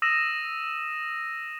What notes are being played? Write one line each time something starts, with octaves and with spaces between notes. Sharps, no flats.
D#6 E6 A#6 D#7 E7